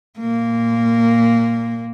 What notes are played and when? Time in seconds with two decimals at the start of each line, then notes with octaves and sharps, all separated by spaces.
0.19 A#2 A#3